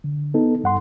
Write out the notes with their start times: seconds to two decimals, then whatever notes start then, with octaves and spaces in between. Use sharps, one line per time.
0.04 D3
0.34 B3 D#4 A4
0.64 G2 F#5 C6